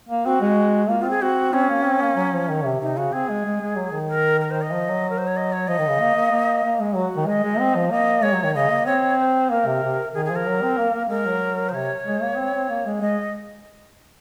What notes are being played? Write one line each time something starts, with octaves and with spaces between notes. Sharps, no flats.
A#3
C4 F#4
G#3
A#3 F4
F4
C4
G#4
C4 F#4
C4 C#4
A#3
C4
A#3
F#3
F3
D#3
C3
C3 D#4
C#3 F#4
C4 G#4
G#3
G#3
G#3
F#3
D#3
A#4
A#4
C5
D#5
F3
F#3
A#4
C5
C#5
D#5
C#5
F3 D#5
D#3
C#3
A#3
A#3
A#3
A#3
G#3
F#3 F#4
D#3
G#3 D#5
G#3
C4
F3
A#3 D#5
G#3 C#5
F#3
D#3
C#3 D#5
A#3
C4 C#5
C5
A#3 A#4
C3
C3
D#3 G#4
G#4
F3
A#4
F#3
C4
A#3
A#3
G#3 A#4
F#3
C5
C3 C#5
G#3
A#3
C4
C4
A#3
G#3
G#3 D#5